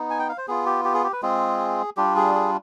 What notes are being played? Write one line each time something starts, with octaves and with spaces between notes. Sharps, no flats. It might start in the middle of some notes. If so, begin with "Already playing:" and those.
Already playing: B3 D#4
G#5
G5
F5
C5
B3 F4 G#4
G4
G4
G#4
G4
B4
G#3 C4 F4 G#4
G3 D4 F4 G4
G#4
G#4